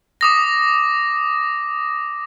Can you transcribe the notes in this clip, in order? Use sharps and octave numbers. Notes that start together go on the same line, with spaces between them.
D6 D#6 A#6